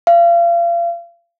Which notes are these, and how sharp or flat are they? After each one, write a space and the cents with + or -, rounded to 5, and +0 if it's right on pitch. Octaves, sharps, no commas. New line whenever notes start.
F5 -35